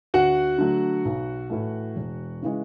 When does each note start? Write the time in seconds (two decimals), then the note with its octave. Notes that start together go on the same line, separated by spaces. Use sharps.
0.14 D2 F#4 F#5
0.58 D3 F#3 A3
1.05 B1
1.50 A2 E3 A3
1.96 E1
2.42 C#3 E3 G#3